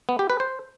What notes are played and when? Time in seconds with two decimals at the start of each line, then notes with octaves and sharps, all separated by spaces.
0.09 B3
0.19 G4
0.30 B4
0.40 C5